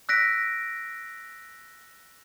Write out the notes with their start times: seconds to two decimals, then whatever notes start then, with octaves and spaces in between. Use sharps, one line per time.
0.09 E6 F#6 A#6 B6 D7